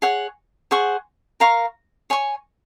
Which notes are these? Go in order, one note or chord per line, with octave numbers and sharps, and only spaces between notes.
G#4 C#5 F#5
G#4 C5 F#5 C#6
A#4 F5 A#5 C#6
C#5 G#5 C#6